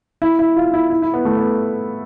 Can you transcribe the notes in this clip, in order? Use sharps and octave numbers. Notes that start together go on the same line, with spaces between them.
E4
E4
F4
E4
E4
E4
B3
A3
B3